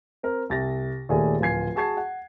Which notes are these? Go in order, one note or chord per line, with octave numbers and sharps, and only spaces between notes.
C4 A#4
C2 A6 A#6
D#2 A#2 A3 G#4 D5 G#5
D1 F3 F4 G#5 G#6 C7
F#4 G#4 A5 C#6 G#6 C7
F#5